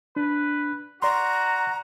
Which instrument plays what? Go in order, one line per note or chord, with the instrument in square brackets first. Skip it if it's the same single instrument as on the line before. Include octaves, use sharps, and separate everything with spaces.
[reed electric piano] D4 [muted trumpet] B4
[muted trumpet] F#4 [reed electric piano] D5 C6 [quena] A#5